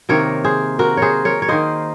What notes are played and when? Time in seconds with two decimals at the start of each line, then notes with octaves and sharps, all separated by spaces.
0.09 C3 D#3 A#3 A#4 C#5
0.44 G#4 C5
0.79 F#4 A#4
0.97 G#4 C5 C#5
1.25 A#4 C#5
1.42 C#5
1.48 D#3 A#3 C5 D#5